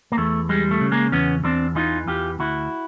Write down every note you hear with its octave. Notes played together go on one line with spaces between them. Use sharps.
A#3
E2 A3
G3 G#3
A3
C#3
G#3 A#3
E2 B3 C#4
E2 C4 D4
E3 D#4 F4
E2 F4 G4
D2 E4 F#4